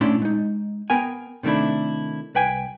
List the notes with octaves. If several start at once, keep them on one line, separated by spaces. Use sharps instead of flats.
A#2 A3 C#4 D4 E4 C6
G#3 D#4
B3 A#4 G5 G#5
C3 D#3 A3 D4 E4
C2 B4 G5 G#5